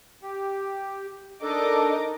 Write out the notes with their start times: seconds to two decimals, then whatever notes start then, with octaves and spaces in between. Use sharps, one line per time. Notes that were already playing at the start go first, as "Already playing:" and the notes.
0.23 G4
1.43 D4 D#4 A4 A#4 D#5 D6